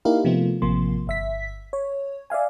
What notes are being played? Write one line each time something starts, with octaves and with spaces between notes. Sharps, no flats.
A#3 D#4 E4 G4 A#4 F5
C3 F3 A3 B3 F4
A1 C3 F3 A#3 C6
G1 E5 B6
C#5
D5 E5 F5 G#5